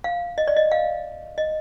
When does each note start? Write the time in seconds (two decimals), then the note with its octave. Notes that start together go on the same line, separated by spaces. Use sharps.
0.04 F5
0.38 D#5
0.48 D5
0.56 D#5
0.72 F5
1.38 D#5